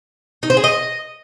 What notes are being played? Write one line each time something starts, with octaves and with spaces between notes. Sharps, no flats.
D#4
C5
G#4
D#5